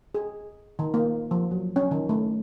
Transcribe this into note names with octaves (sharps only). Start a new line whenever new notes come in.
G#4
D#3
A#3
F3
F#3
C#4
D#3
A3